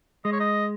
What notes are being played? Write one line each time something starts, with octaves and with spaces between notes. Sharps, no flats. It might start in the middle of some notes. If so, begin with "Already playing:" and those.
G#3 D#5
C#5
D#5